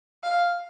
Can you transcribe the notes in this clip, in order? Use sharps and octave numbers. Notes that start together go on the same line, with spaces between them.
F5